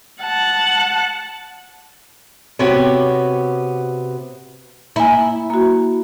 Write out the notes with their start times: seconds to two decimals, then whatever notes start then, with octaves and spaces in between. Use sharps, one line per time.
0.22 F#5 A5
2.59 C3 B3 F#4 G4 C#5
4.96 A#3 E4 G#5
5.50 A#3 F#4